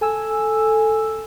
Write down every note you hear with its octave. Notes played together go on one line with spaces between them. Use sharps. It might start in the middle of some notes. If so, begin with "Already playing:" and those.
A4 G#5 E6